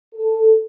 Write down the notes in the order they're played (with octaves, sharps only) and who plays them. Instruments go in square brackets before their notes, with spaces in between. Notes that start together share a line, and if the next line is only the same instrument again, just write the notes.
[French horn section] A4